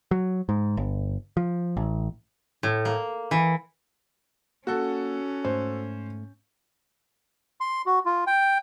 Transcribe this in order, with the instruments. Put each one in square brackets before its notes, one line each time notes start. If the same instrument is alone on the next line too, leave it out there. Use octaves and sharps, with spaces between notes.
[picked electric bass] F#3
G#2
G1
F3
A1
[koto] A2
A#3
E3
[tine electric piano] A#3 [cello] C#4 [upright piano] F#4 A4
[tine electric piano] G#2 A3 [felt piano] C5
[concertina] C6
F#4
F4
G5